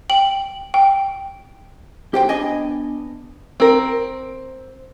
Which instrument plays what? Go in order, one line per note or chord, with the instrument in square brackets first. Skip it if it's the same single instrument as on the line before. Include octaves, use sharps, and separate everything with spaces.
[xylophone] G5 F#7
G5
[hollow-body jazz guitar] G4 C5 G5
B3 D4 D#5 G#5
[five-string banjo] C4 A#4